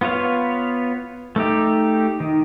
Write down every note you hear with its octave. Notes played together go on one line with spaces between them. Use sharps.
B3 F4 B4 C#5 F5
A3 D#4 G4
D#3